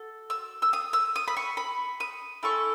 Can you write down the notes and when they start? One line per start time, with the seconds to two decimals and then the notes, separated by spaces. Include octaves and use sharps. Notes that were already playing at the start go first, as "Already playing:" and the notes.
Already playing: F#4 A4
0.30 E6
0.62 E6
0.73 D#6
0.93 E6
1.16 D#6
1.28 B5
1.37 C#6
1.57 B5
2.00 D#6
2.43 C#4 E4 A4 C#6